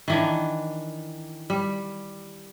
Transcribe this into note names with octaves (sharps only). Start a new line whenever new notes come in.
D#3 E3 D4
G3